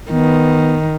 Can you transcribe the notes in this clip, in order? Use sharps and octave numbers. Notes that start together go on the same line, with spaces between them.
D#3 B3